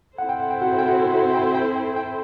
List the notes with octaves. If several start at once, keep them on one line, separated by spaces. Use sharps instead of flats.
C4 E4 A4 C5 F#5
G5
F#5
G5
F#4 F#5
G5
F#4 F#5
F#4 F#5
G5
G5
G5
G5